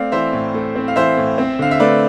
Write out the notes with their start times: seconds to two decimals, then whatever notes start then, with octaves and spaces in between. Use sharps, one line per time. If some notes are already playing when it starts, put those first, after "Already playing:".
Already playing: A3 C4 D5 F5
0.12 E3 C5 E5
0.33 A2
0.54 A3
0.75 C4
0.88 F5
0.96 E3 C5 E5
1.17 A2
1.38 C4
1.59 D3 F5
1.71 E5
1.80 A3 B4 D5